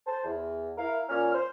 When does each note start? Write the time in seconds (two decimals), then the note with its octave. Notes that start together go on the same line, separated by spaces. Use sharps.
0.07 C5 A5
0.24 E2
0.77 E4 A#4 F5
1.09 A#2 C#4 F6
1.33 C5